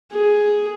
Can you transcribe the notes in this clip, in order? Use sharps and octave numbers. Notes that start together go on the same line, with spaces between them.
G#4